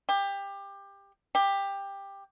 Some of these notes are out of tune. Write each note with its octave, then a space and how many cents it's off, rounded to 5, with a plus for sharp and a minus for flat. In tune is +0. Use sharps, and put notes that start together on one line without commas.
G4 +20
G4 +15